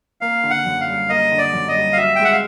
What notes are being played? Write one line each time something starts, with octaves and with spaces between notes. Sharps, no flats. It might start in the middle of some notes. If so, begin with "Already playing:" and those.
A#3 F5
D3
F#5
F#2
F5
G3
A#3 D#5
D3
D5
F#2
D#5
G3
F5
F#4 E5
G5
G#3
F#5
F5